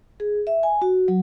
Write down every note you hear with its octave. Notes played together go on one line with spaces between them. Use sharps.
G#4
E5
G#5
F#4
F#3